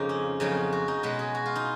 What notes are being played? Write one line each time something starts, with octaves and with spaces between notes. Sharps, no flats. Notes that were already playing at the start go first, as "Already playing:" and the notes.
Already playing: F2 C#3 F3 A#3 D#4
C#4
F2 C#3 F#3 B3 D#4
F#4
D#4
B2 G#3 C#4 B4
G#4
F#4
F4
D#4